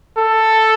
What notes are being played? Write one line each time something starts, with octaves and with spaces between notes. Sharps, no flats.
A4